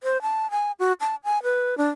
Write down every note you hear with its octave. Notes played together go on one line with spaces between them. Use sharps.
C5
A5
G#5
F#4
A5
G#5
B4
D4